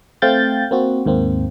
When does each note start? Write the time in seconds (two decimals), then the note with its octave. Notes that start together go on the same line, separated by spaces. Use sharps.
0.22 A3 C4 F5 G5 G6 A6
0.71 A#3 C4 F#4
1.05 D#2 G#2 A#3 C4